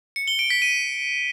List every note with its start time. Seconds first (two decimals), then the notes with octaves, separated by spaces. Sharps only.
0.16 C#7
0.28 G7
0.39 D7
0.50 B6
0.62 D#7